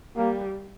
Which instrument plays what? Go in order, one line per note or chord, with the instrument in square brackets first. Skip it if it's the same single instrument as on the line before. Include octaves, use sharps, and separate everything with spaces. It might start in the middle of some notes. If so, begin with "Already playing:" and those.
[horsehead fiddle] G3 [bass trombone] A#3